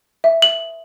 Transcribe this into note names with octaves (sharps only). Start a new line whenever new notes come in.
E5
F#7